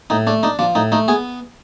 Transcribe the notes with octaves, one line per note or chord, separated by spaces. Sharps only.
A2 D#4
A3 D4
D4 D#4
F3 D4
A2 D#4
A3 D#4
B3 G#4